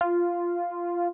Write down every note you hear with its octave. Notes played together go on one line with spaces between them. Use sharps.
F4